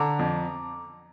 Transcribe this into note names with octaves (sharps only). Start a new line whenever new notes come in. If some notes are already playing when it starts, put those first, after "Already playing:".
Already playing: D3 A#5 D6
F2